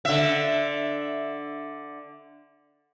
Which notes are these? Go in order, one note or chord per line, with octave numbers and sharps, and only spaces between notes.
D3 E5